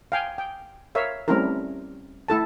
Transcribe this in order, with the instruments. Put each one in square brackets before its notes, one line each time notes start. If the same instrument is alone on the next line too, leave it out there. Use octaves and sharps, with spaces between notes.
[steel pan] F5 G5 G#5
G5
A#4 C#5 E5 F5
G3 A3 C4 C#4 E4 A#4
A3 E4 A4 A5